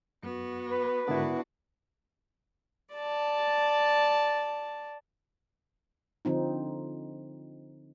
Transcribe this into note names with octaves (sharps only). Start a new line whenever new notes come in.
F#2 B3 F#4
B4
G#2 D3 B3 D4 E4 F#4 A#4
D5 A5
D3 F3 C4 D#4